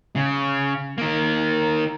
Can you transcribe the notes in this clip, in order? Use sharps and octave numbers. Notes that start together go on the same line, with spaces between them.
C#3
D#3 A#3